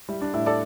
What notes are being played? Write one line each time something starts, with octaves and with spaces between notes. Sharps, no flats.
G3 E4
D4
A2 E4
A4 D5